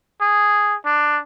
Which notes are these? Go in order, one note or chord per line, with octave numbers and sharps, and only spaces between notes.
G#4
D4